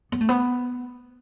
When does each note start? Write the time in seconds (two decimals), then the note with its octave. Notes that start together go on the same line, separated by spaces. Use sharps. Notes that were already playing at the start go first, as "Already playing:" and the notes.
0.12 B3
0.21 A3
0.29 B3